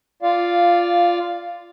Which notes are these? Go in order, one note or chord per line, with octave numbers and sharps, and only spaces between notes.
F4 D5 F5